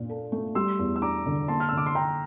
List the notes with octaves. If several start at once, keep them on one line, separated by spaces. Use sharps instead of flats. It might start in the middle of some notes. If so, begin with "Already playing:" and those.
Already playing: A#2 D4
A4
A3
G3 C6 E6
E2
E6
D4 A#5 D6
D3
A#3 A5 C6
F6
D3 E6
D6
C6
D3 G5 A#5